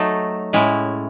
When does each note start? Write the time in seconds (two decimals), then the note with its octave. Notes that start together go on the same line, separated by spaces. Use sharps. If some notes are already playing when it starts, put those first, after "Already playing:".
Already playing: F#3 A3 D#4 A4
0.53 A2 G#3 C#4 E4